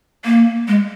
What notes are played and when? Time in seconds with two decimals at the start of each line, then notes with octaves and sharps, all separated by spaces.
0.25 A#3
0.68 G#3